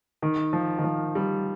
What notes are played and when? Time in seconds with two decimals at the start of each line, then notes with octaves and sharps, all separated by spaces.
0.22 D#3
0.53 F3
0.79 D#3
0.84 F3
1.15 G3